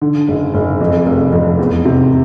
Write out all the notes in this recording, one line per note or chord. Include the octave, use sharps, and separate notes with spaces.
D3
F#1
F#1
F2
F1
F2
E2
C3